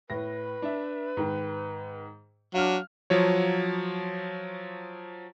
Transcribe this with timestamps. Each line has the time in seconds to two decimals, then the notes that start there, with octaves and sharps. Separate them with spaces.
0.10 A2 B4 A#6
0.62 D4 E5
1.17 G#2 D#3
2.54 F#3 D4 F5 F6
3.10 F3 F#3 C#5